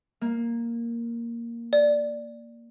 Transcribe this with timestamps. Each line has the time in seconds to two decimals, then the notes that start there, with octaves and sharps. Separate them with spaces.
0.21 A#3
1.73 D5